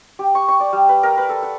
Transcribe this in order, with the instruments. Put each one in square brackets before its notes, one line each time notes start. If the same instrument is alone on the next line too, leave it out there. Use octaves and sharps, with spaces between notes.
[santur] G4
C#6
C#6
D5
G3
B4
A#4
B4
A4
F#5